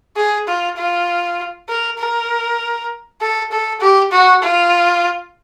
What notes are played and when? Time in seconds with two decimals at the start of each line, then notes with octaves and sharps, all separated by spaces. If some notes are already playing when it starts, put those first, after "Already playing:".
0.17 G#4
0.48 F4
0.78 F4
1.69 A#4
1.99 A#4
3.21 A4
3.51 A4
3.81 G4
4.12 F#4
4.43 F4